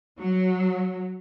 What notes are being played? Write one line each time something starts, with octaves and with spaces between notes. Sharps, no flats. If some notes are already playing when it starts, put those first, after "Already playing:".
F#3